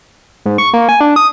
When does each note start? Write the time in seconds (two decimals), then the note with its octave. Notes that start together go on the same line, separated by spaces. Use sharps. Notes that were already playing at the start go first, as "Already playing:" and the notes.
0.46 G#2
0.58 C#6
0.74 A#3
0.89 G#5
1.01 D4
1.16 D#6